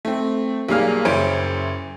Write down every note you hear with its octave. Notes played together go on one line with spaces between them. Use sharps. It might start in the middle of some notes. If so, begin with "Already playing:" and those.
A3 C4
B1 G3 A#3 G#4 F5 F6
F#1 E4 C5 C#5 D7